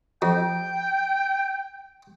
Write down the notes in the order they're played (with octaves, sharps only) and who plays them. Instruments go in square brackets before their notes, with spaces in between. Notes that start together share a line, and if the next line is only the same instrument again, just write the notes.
[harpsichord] F2 [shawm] G5